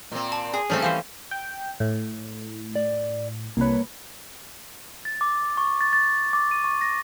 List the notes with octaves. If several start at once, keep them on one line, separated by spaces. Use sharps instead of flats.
A#2 C4
A5
G#4
F3 G3 A3 C4 C#4
E3 C4 C5 F5
G5
A2
D5
C2 A#3 B4 C#5
A6
D6
C#6
A6
A6
D6
D#7
C#6
A#6